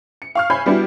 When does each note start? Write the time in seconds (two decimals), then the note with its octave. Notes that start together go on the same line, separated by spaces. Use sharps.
0.22 C#7
0.35 F5 C#6 F6
0.50 C#5 E5 G#5 B5 G6 C7
0.66 G3 B3 D4 E4 F#4 G4